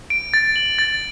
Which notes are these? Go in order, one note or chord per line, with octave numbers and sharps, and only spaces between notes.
D7
A6
F#7
A6